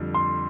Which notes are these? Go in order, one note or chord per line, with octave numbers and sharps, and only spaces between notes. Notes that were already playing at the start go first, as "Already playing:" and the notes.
Already playing: F2 D3 G3
C6